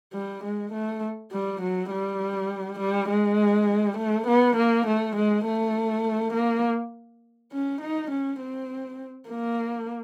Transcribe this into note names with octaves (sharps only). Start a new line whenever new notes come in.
G3
G#3
A3
G3
F#3
G3
G3
G#3
A3
B3
A#3
A3
G#3
A3
A#3
C#4
D#4
C#4
C4
A#3